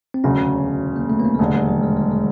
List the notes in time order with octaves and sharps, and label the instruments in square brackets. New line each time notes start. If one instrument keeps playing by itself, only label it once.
[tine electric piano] C4
[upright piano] E1 D2 C#3 F#3 [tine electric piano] C#4
[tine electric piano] A#3
A3
B3
A#3
G#3
[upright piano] E1 D#2 D3 [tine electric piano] A3
[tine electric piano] G3
F#3
G#3
G#3
G#3